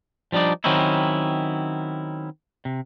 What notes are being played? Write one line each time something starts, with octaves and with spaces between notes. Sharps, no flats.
F3 G3 D4 D#4 D5
D#3 F#3 C4 C#4 D#4 E4
C3